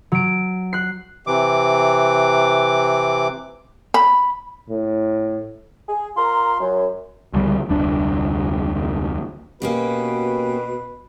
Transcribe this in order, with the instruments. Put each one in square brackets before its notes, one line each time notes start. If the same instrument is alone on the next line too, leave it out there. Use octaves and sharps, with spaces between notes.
[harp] F#3 D7
F#6 C7
[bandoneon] C3 E3 D6
[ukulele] B5
[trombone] A2
[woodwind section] G#4
F4 A#4 A#5 C6
F#2
[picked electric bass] C#2 D3 E3 G3
F1 D2 G3 D4
[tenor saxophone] B2 [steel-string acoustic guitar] A#3 C#4 G4 [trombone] F#4 [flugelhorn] B4